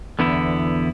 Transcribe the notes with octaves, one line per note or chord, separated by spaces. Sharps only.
E2 D3 B3 E4